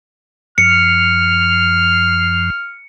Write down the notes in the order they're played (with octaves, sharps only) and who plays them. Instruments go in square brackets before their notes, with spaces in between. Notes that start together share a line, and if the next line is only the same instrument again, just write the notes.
[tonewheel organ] F#2 F3 [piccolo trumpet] F6 [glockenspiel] C#7